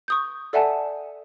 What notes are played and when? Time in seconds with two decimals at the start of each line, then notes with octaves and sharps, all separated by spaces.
0.08 C#6 D#6 G6
0.53 A4 D5 E5 F#5 G#5 A5